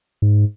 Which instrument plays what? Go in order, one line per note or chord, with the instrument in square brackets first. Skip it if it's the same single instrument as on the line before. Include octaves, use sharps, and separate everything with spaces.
[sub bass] G#2